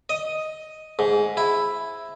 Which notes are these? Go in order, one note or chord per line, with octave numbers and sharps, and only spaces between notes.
D#5
G#2
E4